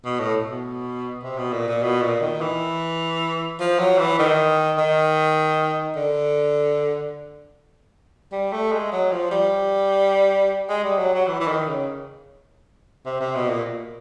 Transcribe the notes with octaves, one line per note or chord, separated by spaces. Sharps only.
B2
A2
B2
C3
B2
A#2
A#2
B2
A#2
D#3
E3
F3
F#3
E3
D#3
D#3
D3
G3
A3
G#3
F#3
F3
G3
G#3
G3
F#3
F#3
E3
E3
D#3
C#3
C3
C3
B2
A#2